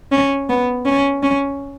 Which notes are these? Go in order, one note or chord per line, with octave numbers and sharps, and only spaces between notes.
C#4
B3
C#4
C#4